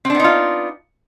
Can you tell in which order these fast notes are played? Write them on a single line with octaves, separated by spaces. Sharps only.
C4 D4 B3 D#4 F4